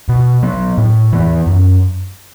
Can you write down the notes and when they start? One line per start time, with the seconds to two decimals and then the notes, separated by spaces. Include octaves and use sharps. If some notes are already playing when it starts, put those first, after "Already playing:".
0.09 B2
0.43 F#3 B3
0.78 A2
1.13 E3 B3
1.47 F#2